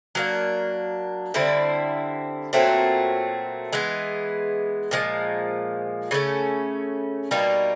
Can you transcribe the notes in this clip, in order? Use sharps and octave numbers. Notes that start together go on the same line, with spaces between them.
F#3 A#3 D4
D3 G3 C4 E4
A#2 F#3 A3 C4
E3 G#3 B3
A#2 F3 G#3
C#3 F3 A3 C#4
B2 G3 A#3 D#4